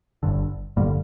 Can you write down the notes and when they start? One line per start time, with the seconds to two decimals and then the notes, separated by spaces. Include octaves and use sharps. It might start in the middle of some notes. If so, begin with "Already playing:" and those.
0.23 G1 G2 D3
0.76 G1 G2 D3 G3 A#3